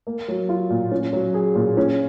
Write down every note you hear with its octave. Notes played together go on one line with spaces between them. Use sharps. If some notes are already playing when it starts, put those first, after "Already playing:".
A#3
F#3
F4
A#2
C#4
F#3
G#4
A#2
C#4